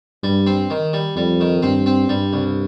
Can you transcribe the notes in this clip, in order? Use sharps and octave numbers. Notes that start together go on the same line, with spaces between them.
G2 G3
C4
D#3
G3
F2 G3
D#3
G2 C4
C4
G2 G3
C2